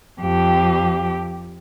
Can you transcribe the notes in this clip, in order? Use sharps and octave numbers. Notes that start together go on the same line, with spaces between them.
F2 G4